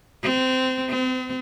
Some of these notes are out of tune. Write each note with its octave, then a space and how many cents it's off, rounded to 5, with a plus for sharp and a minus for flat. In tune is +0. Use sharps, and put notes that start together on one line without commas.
C4 -20
C4 -40